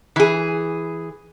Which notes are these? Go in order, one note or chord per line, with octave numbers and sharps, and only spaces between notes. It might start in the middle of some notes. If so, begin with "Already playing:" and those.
E3 G#4